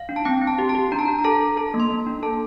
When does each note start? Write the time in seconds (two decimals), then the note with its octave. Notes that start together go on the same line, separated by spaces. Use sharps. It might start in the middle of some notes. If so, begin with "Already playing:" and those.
Already playing: F5
0.09 D4
0.16 A5
0.25 C4 G5
0.42 C4
0.47 A5
0.59 G4
0.69 A5
0.75 G4
0.92 D4 A#5
0.99 A5
1.05 D4 A#5
1.19 A#5
1.24 A4 A5
1.41 A4
1.57 A4 A5
1.74 A#3
1.80 C6
1.90 A#3
2.07 D4
2.23 A4 A5